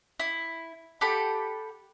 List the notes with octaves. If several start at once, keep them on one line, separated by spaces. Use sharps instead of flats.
E4
G4 A4 F#5 B5